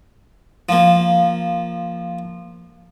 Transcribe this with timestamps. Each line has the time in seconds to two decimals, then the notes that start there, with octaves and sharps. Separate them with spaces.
0.69 F3 A#3